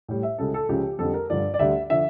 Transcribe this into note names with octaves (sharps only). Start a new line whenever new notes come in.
A2 G3
E5
C#2 C#3 G3 A4
A4
C#2 C#3 F3 G4
F2 D3 G3 A4
A#4
G2 D3 F3 D5
D5
D2 D3 G3 E5
D3 F3 E5